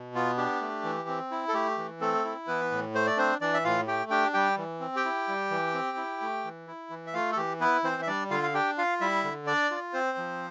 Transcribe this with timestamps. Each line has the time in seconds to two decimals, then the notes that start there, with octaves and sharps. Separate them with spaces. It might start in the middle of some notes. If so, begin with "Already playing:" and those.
Already playing: B2
0.15 B3 F4
0.37 D4 G4
0.61 A3
0.84 E3
1.08 C4
1.31 E4
1.48 A4
1.54 A3 G4
1.78 E3
2.01 A3 C4 A4
2.25 E4
2.47 E3 B3 B4
2.71 A2
2.94 A3 C5
3.07 D5
3.17 C4 D4 C5
3.41 E3 D4 D5
3.54 E5
3.64 A2 F4 F5
3.87 A3 G4 G5
4.10 D4 G4 G5
4.34 G3 G4 G5
4.58 E3
4.80 C4
4.96 G4 G5
5.05 E4
5.28 G3
5.51 E3
5.74 C4
5.97 E4
6.21 A3
6.45 E3
6.67 E4
6.90 E3
7.07 E5
7.13 A3 F4 F5
7.32 A4
7.37 E3 G4
7.60 B3 E4 B4
7.84 E3 C4 C5
8.02 E5
8.07 G3 D4 D5
8.31 D3 F4 F5
8.43 F5
8.54 D4 G4 G5
8.78 F4 F5
9.01 G3 E4 E5
9.24 D3
9.47 D4 D5
9.71 F4
9.93 C4 C5
10.17 F3